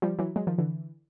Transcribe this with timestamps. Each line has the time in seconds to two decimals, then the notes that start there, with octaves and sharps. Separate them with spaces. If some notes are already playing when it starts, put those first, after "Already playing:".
0.02 F3 G3
0.19 E3 F#3
0.36 F#3 G#3
0.47 D#3 F3
0.58 D3 E3